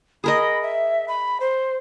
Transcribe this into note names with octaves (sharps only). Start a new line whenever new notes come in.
G#4 A#4 D#5 B5
E5
B5
C5